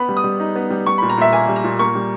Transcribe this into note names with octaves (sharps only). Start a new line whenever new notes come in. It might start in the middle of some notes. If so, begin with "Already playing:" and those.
Already playing: B3 B5
G3
D#6
G3
D#4
B3
G3
G3 C#6
A#2 B5
A#5
A#2 E5
A#3 G#5
G3
A#5
A#2
A#3 C#6
G3